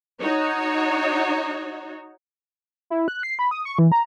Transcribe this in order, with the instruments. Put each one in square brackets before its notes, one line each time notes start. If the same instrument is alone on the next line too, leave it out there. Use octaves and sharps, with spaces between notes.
[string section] D#4 F#4 C#5
[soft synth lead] E4
F#6
C7
B5
D#6
C#6
E3
A#5